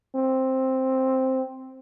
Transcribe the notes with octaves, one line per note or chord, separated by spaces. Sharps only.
C4